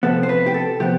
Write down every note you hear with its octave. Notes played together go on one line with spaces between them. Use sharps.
C3 F3 B3 A4
C5
B4
G4
A4
C3 F3 B3 G4